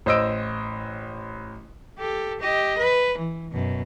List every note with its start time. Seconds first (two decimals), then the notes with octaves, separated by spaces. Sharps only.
0.06 A1 C5 D#5 E6 D7
1.99 G4 A4
2.40 G4 D#5
2.78 B4
3.18 E3
3.51 F#2 B2